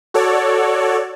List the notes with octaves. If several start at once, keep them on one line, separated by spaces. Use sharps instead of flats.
F#4 A4 C#5 D5